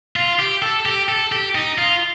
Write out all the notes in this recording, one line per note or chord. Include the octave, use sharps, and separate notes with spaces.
F4
G4
A4
G4
A4
G4
D#4
F4